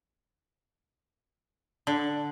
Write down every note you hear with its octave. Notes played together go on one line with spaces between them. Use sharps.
D3